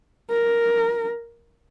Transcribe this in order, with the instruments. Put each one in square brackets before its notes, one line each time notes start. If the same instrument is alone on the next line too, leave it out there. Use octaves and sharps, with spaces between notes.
[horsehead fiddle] A#4